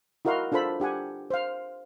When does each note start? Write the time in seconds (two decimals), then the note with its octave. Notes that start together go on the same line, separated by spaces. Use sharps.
0.25 E4 F#4 A#4 D#5 F5 C6
0.52 D4 F4 A4 C5 B5
0.80 D4 G4 F#5 G#5
1.30 C5 F5